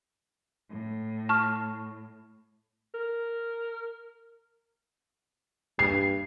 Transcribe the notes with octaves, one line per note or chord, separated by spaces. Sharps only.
A2
A5 C#6 F6
A#4
G2 C7